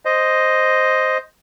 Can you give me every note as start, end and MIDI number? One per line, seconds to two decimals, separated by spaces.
0.05 1.18 72
0.05 1.18 75